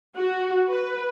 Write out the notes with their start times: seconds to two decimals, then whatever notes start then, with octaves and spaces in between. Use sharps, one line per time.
0.16 F#4
0.70 B4